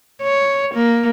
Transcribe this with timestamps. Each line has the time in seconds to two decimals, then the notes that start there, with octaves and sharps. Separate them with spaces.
0.23 C#5
0.74 A#3